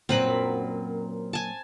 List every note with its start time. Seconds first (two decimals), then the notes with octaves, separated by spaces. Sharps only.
0.09 F#2 A#2 C4 D4 B4 B5
1.33 G#5 A5